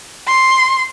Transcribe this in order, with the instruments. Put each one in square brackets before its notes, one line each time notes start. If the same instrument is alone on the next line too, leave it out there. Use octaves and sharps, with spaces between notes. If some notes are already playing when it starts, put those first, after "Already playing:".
[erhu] C6